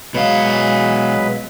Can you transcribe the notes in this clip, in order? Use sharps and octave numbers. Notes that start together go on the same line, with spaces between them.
B2 F#3 G#3 B4 F5